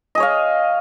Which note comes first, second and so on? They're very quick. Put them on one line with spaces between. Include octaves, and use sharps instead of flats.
D#5 G#4 C#5 F5